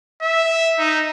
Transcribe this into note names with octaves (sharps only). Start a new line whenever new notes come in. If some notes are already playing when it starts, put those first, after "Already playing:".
E5
D#4